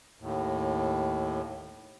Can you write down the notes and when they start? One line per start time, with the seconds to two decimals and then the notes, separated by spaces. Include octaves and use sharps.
0.20 D#2 A2